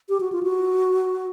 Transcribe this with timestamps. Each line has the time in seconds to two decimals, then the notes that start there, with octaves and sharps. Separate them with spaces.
0.09 G4
0.20 F#4
0.32 F4
0.43 F#4